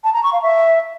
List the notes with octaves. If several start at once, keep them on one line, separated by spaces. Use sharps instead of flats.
A5
A#5
C#6
F5
E5